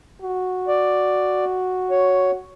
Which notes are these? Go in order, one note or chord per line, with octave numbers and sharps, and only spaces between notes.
F#4
D5
C#5